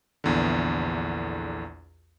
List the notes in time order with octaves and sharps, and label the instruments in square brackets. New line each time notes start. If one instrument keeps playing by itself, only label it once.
[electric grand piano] A#1 E2 D3